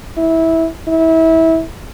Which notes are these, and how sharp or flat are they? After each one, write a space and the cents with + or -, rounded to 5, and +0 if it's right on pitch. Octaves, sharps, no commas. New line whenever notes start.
E4 -15
E4 -25